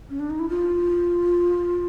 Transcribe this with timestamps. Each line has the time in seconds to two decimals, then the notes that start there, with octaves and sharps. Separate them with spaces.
0.10 C#4
0.20 D4
0.30 D#4
0.39 E4
0.49 F4